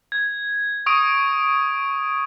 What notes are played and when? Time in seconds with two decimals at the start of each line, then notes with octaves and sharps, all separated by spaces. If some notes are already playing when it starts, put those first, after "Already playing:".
0.12 G#6
0.86 C#6 D#6 D7